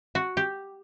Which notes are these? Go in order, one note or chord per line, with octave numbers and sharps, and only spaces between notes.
F#4
G4